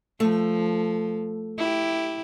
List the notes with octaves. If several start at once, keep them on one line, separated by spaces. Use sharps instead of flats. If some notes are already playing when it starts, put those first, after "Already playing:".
F3 A3
E4 G4